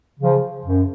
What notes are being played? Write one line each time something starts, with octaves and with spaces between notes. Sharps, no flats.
C#3 F3
F#2